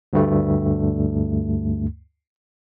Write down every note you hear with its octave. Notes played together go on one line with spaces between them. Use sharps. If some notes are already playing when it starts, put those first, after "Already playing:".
D2 G2 A3